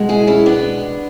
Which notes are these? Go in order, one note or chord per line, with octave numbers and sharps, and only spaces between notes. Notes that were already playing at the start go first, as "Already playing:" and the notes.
Already playing: B2 G#3
E4 G#4
C#4 E4
B3 D4